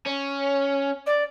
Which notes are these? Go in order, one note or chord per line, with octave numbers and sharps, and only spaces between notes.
C#4
D5